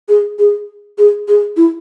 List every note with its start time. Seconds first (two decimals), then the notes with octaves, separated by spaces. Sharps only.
0.09 G#4
0.39 G#4
0.98 G#4
1.28 G#4
1.57 E4